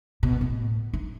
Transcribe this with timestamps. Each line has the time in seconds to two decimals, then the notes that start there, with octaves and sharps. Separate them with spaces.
0.23 B2
0.41 A2
0.93 D#4